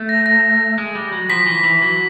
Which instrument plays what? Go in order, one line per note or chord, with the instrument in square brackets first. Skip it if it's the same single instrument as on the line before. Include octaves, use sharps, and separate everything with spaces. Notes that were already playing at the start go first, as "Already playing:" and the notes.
Already playing: [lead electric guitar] A3
[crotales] A#6
A#6
[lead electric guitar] G#3
G3
F#3
[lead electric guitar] F3 [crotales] B6
[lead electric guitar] E3
E3
F#3